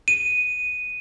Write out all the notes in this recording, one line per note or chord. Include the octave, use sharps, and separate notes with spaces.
D#7